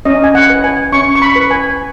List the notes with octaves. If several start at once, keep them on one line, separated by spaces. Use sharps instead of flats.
C#4 D#5
G#5
F#5
B4
G#5
C#4 C#6
C#6
B5
B4
G#5